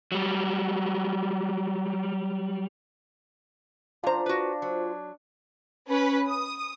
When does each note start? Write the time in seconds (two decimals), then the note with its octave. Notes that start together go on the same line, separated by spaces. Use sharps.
0.12 F#3 G3
4.04 F#2 D4 F4 C5 A#5
4.26 F#4 B4
4.62 F#3
5.90 C#4 B4
6.28 D#6